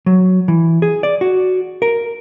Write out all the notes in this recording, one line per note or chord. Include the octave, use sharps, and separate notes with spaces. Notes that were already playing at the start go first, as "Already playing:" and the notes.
F#3
E3
G#4
D5
F#4
A#4